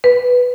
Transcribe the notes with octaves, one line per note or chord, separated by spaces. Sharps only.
B4